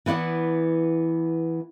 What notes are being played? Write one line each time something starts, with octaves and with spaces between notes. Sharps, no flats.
E3 B3 E4 D5 F#5